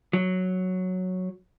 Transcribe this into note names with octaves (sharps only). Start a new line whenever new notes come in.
F#3